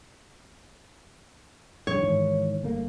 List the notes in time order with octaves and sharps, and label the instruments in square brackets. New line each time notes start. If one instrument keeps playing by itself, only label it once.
[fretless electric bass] F1 G3 D4 [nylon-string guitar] C#5
[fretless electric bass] G#2 D#3 E3
G1 A3 A#3